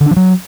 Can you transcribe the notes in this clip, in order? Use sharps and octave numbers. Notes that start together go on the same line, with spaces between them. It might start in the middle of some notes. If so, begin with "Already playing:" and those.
D3
D4
F3
F#3